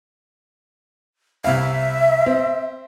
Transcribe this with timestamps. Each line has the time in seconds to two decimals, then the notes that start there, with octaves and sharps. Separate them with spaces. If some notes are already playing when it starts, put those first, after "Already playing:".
1.44 C2 E5 F5
2.26 C4